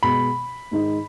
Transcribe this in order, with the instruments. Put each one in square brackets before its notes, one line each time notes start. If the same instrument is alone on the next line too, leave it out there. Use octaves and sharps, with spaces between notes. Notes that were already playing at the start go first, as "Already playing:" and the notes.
[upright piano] B2 G#3 B3 [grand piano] B5
[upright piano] G#2 D#3 G#3 D#4